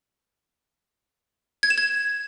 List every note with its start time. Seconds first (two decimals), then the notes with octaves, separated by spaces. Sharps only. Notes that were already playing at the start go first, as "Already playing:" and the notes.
1.63 G#6
1.70 E7
1.78 G#6